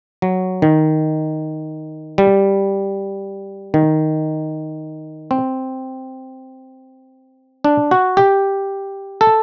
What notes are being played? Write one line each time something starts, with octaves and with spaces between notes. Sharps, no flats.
F#3
D#3
G3
D#3
C4
D4
F#4
G4
A4